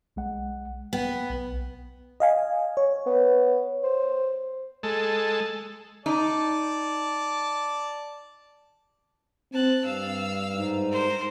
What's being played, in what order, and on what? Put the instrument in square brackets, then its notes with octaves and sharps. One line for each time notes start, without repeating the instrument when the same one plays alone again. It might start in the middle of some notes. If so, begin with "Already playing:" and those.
[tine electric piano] B1 G#3 F#5
[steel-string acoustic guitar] B3 [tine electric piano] F#5 G5
[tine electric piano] B1
[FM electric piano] D#5 F5 G#5
C#5
[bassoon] B3
C5
[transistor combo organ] G#3 A4
[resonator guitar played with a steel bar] D#4 [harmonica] D5 A5
[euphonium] C4 [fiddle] A5 F#6
[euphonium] G2 [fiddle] F5 E6
[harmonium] G#2
[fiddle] A#4 C5